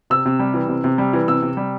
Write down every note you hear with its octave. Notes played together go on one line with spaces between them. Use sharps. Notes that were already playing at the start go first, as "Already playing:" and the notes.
C3 E6
C3
G3
E3
C3
C3
G3
E3
C3 E6
C3
G3